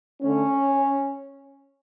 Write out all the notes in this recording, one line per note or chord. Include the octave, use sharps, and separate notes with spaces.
D3 A3 C#4